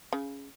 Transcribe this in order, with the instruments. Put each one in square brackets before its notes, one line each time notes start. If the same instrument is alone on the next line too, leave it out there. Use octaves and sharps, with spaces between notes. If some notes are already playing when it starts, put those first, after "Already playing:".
[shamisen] C#3